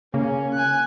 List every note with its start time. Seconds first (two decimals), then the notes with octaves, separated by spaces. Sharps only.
0.14 C#3 A#3 C#4
0.54 G#5 F#6